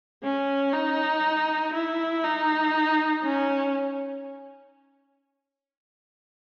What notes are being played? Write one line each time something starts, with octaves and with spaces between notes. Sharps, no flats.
C#4
D#4
E4
D#4
C#4